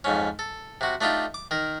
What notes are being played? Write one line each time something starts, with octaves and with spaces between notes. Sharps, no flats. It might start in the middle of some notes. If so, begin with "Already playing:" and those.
F2 G#2 C#4
A4
C3 F#4
A3 D4 D#4 F4 G4
D6
D#3 A#4